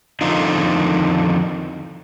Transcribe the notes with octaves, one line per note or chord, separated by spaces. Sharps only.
F2 D3 D#3 D#4 F4